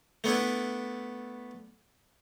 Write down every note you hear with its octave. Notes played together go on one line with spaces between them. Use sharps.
A3 B3 D4 E4